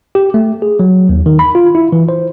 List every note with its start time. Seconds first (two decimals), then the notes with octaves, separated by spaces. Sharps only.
0.15 G4
0.34 A3
0.62 G#4
0.79 F#3
1.09 D#2
1.26 D#3
1.39 B5
1.55 F4
1.75 E4
1.92 E3
2.09 C5